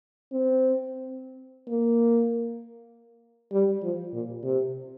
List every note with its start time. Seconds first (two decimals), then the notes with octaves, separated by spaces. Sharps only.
0.32 C4
1.68 A#3
3.52 G3
3.83 F3
4.13 A#2
4.43 C3